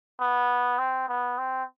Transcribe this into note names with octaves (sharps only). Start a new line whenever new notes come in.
B3
C4
B3
C4